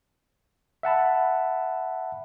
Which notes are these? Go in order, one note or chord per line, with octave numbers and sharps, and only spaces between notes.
E5 F#5 A5 B5